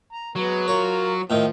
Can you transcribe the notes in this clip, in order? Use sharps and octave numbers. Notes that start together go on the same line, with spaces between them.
A#5
F#3 G#3 B3
F4 A#4 C#5
A2 D#3 F3